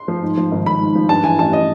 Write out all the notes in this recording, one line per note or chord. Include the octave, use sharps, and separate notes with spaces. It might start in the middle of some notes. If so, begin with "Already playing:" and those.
Already playing: C6
F3
G#2
F3
G#1
G#1 B5
G#2
F3
G2 A5
E3 G#5
A1 A5
D#5